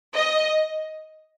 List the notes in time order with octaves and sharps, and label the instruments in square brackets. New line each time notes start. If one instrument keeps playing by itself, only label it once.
[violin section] D#5